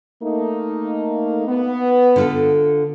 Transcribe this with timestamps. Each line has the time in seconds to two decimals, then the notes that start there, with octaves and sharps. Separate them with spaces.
0.23 A3 A#3 D#4
1.48 B3
2.16 D3 F4 A4